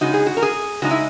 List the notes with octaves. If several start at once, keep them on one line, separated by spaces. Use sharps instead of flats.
C#3 G#3 D#4 F#4
G#4
F#4
A#4
G#4
C#3 G#3 D#4 F#4
E4